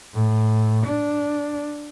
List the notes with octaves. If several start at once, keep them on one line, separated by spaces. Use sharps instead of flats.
A2
D4